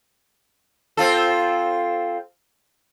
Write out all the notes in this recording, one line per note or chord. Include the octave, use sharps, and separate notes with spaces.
C4 F4 A4